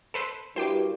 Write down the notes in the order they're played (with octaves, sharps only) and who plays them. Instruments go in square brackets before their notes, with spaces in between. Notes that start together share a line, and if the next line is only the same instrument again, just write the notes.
[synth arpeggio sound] A4 B4 C5
[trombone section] G2 [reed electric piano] E4 F#4 A#4 [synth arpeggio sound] C5 G5 D6